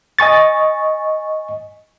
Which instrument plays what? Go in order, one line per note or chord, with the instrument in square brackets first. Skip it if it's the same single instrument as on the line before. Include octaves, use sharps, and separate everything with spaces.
[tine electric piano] D#5 G#5 C#6 A6